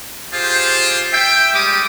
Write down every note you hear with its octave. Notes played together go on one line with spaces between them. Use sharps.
F4 G4 G#4 C5
E5 G5
G3 G#3 G4 D6 D#6